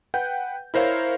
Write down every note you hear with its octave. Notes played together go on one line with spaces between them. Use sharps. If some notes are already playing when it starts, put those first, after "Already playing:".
B4 F#5 G5 G6
E4 A#4 C5 C#5 F5